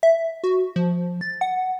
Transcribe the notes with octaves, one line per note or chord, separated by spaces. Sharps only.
E5
F#4
F3
A6
F#5